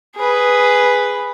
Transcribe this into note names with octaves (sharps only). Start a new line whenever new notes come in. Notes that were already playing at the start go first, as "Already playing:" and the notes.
G#4 B4